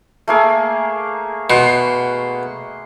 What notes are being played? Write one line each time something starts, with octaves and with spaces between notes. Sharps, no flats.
A3 A#3 G#4
B2 F#5 C6